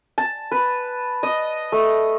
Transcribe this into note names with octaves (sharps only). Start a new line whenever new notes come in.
A5
B4
D#5
A3